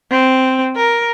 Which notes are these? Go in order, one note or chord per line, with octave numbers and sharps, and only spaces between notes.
C4
A#4